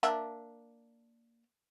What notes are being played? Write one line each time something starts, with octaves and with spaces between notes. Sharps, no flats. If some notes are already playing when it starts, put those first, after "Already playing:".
A#3 D4 E5